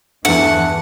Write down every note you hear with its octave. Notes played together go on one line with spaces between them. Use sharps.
E2 G2 E3 A3 F#5